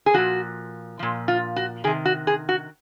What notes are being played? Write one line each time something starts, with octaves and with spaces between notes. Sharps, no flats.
G#4
A#2 F3 F#4
A#2 F3
F4
F#4
C3 D#3 G#4
F#4
G#4
F#4